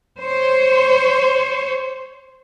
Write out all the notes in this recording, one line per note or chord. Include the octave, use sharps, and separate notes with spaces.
C5 C#5